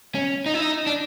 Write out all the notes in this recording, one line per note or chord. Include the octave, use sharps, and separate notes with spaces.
C#4
D#4
E4
D#4
D4